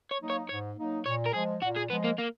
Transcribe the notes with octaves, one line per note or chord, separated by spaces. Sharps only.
C#5
F#3 A#3 D#4
C#5
G#2 C#5
F#3 A#3 D#4
A#2 C#5
A#4
F3 G#3 G#4
A#2 F#4
G#4
F3 G#3 B3
A#3
A#3